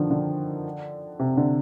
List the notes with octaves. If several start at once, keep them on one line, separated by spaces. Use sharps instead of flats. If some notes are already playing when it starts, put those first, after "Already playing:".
Already playing: D3 D#3 F3
D3
C3
D3